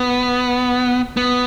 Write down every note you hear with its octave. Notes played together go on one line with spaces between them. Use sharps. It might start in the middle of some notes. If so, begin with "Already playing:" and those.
Already playing: B3
B3